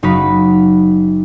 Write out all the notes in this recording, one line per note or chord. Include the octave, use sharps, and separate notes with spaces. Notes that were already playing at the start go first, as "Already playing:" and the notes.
F#1 D#4 F#4 B4 B6